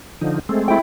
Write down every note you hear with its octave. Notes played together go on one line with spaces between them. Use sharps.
D3 F3 D#4
G#3 A3 C4
E4 G5